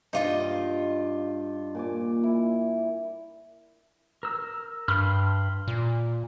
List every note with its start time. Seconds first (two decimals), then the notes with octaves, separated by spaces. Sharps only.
0.13 G2 D#4 F4 D5 D#5
1.75 A#2 G#5 D6
2.23 E4
4.23 A#4 E6
4.88 G2 B5 C6 F6
5.67 A#2